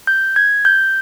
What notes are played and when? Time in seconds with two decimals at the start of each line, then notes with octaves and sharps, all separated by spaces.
0.07 G6
0.36 G#6
0.65 G6